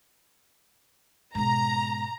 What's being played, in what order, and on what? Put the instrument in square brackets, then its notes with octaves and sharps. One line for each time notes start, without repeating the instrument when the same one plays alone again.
[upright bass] G#2 B2 [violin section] A#5